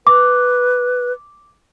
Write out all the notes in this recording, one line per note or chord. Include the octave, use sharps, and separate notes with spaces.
B4 D6